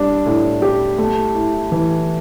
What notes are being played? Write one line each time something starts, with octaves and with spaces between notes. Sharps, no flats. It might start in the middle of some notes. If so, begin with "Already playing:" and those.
Already playing: G3 D4
A2
G4
A3
E4
E3